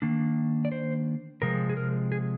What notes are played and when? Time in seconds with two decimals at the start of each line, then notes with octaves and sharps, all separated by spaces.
0.02 D#3 A#3 D4
0.65 D5
0.72 C5
1.42 C3 F3 G#3 A#4
1.70 G#4
1.77 A#4
2.12 G#4